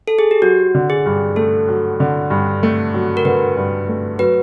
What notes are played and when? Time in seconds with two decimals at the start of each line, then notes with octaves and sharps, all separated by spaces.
0.08 A4
0.19 G#4
0.31 G4
0.42 F#3 F#4
0.75 D3
0.90 G#4
1.06 G2
1.36 A3 A4
1.68 F#3
2.00 D3
2.30 G2
2.63 A3
2.94 F#3
3.17 A#4
3.25 D3 B4
3.57 G2
3.89 A3
4.19 F#3 B4